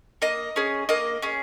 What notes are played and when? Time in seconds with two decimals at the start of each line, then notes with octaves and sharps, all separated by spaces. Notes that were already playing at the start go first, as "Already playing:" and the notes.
0.22 A#3 D#5
0.56 C#4 G#4
0.89 A#3 D#5
1.22 C#4 G#4